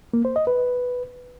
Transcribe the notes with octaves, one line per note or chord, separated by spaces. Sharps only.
A#3
C5
D#5
B4